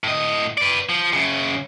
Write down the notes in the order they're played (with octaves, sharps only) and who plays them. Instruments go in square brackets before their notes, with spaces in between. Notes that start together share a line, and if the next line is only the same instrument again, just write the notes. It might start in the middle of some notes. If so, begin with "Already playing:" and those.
[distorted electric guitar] A2 D#5
B4 D5
F3
F#2 C#3